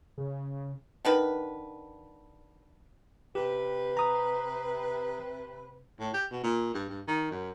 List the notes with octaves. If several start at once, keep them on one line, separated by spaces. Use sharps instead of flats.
C#3
D3 D#3 B4
C3 G4 B4
A#5 D#6
A2
G4
B2
A#2
G2
G2
D#3
F#2